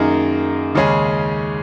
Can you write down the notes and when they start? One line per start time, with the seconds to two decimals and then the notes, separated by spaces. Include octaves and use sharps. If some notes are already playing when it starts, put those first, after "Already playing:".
Already playing: F#2 D#3 A#3 D#4 G#4
0.75 D#2 C#3 G#3 C#4 G#4